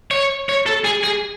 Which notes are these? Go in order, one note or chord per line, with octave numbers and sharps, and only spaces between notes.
C#5
C#5
A4
G#4
G#4